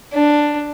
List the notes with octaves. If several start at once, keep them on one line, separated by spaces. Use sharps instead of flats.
D4